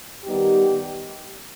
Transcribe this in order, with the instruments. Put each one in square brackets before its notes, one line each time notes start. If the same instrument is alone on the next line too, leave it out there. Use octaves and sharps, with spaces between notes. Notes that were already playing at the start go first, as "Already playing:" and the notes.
[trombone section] D#3 G3 B3 D#4 G4